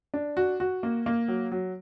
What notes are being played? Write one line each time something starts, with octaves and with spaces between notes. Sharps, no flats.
D4
F#4
F#4
A#3
A#3
F#3
F#3